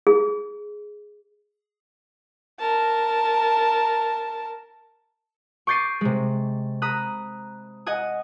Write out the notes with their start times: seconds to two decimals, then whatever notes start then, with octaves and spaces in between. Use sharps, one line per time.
0.07 G#4
2.59 A#4 A5
5.67 C#6 D6 G6 A6 C7 D#7
6.01 C3 G#3
6.82 A#5 B5 D#6 F#6
7.86 D#5 F#5 G#5 D#6